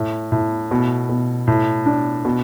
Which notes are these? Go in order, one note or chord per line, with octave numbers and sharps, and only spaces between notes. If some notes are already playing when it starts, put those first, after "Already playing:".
Already playing: A2
A2
B2
B2
A2
D4
B2